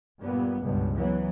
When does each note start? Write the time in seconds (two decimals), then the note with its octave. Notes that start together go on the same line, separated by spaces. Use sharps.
0.20 G2 A#2 G3 B3
0.61 C#2 G2 B2
0.94 E3 F#3 B3